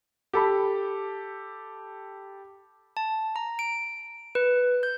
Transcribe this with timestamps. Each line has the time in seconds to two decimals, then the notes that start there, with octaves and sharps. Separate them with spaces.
0.33 G4 A4 B5
2.97 A5
3.36 A#5
3.59 D7
4.35 B4
4.83 G6